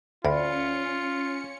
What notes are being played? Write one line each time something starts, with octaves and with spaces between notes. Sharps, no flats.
D2 C#4 F4 D5 B5 C#7